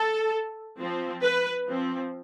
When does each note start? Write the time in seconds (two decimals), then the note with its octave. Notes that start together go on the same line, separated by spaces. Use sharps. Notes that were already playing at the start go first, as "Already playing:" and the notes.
Already playing: A4
0.79 F3 C4
1.23 B4
1.68 F3 C4